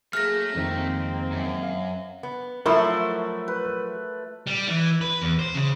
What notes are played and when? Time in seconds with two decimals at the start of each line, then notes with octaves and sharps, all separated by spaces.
0.13 F#3 A3 A#3 G#4 F6 A#6
0.55 F2 D#3 G#3 A#3 C4
1.32 F#2
1.63 F5
2.23 B3
2.66 F3 F#3 A3 E4 A#4 C6
3.48 B4
4.47 G3
4.68 E3
5.01 B4
5.22 E2
5.39 C5
5.55 C#3